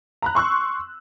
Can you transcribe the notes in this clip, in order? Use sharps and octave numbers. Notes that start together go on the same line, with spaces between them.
A#5 B5 F#6
C6 C#6 E6 F#6